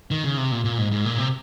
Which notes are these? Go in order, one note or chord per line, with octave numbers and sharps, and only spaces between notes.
D#3
C#3
C3
A#2
A#2
G#2
G#2
A#2
C3